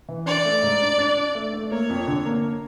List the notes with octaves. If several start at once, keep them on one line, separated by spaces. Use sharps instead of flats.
E3
D4 D5
A3
G#2
D4
D4
D4
A3
A3
A#3 C#5
F2
D3
A#3